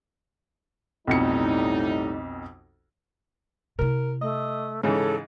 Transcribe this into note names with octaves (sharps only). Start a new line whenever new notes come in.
B1 F2 A2 G3 D#4 C#7
C3 E4 A#4
A3 D#5
G#2 C#3 E3 C#4 A4